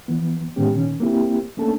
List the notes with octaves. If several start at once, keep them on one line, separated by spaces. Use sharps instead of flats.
E3 F3 B3
A2 D#3 G#3 B3 C#4 G4
A#2 D#3 C#4
A#3 C4 E4 G4
A3 A#3 C#4 D4 A4 A5